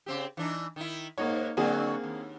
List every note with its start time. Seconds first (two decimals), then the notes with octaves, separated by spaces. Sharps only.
0.06 C#3 C4 G4
0.37 E3 D4 D#4
0.76 D#3 E4
1.18 G#2 A#3 D#4 C#5
1.57 D3 F#3 A#3 C4 G#4
2.04 D#2